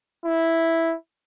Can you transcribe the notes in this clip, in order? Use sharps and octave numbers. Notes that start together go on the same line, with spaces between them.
E4